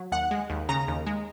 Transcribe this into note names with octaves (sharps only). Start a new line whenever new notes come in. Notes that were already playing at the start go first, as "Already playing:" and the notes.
Already playing: F#3
D#2 F#5
G#3
D#2
C#3 A#5
D#2
G#3